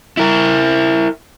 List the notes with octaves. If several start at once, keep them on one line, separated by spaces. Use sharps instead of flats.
E4 A#4